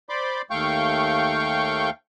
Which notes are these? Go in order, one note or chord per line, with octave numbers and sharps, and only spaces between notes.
C5 D5 B5 C6 D6
D#2 A3 F5 G5 C#6 G6